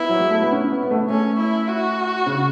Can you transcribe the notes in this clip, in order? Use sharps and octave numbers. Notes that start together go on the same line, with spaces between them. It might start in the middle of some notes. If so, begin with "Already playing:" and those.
Already playing: B3 E4
F#3
G#3
A3
B3
C#4
B3
B3
A3
A3 C#4
E4
F#4
C#3